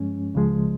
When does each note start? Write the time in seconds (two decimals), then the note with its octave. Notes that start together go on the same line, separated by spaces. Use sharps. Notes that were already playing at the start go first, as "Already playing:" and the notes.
Already playing: G2 F3 G#3 C#4
0.34 C#2 C#3 F3 G#3